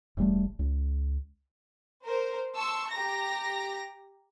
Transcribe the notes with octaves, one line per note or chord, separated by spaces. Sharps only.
E1 A1 G3 A3
C#2
A#4 C5
A5 C6 C#6 E6
G4 A#5 A#6